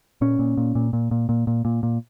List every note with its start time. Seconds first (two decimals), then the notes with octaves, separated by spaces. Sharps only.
0.21 A#2 C#4
0.39 A#2
0.57 A#2
0.75 A#2
0.93 A#2
1.11 A#2
1.29 A#2
1.47 A#2
1.65 A#2
1.83 A#2